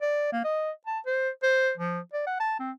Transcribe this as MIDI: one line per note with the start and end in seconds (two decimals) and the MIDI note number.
0.02 0.31 74
0.32 0.44 58
0.44 0.71 75
0.87 0.99 81
1.06 1.29 72
1.43 1.71 72
1.77 2.00 53
2.14 2.24 74
2.27 2.38 78
2.40 2.57 81
2.59 2.72 60